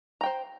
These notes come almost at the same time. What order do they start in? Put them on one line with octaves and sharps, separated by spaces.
A#5 G5 C5